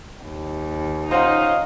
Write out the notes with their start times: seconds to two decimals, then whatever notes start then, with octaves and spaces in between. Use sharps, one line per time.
0.22 D#2
1.11 C#4 D#4 F4 C5 D#5 F5 F#5 C6